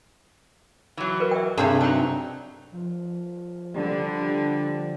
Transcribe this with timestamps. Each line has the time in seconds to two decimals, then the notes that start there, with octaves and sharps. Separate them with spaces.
0.97 E3 F#3
1.20 A#4 B4
1.31 E5 G5
1.58 G2 C3 G3 G#4 A4
1.81 F#3 D#4 G5
2.72 F3
3.76 D3 G3